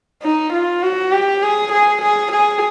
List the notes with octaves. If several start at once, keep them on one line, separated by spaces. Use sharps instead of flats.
D#4
F4
F#4
G4
G#4
G#4
G#4
G#4